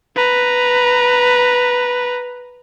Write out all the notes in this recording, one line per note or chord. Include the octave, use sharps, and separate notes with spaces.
B4 A#5